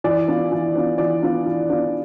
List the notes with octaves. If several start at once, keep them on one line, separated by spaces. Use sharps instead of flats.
E3 D5
B3 D4 F4
E3
B3 D4 F4
E3 D5
B3 D4 F4
E3
B3 D4 F4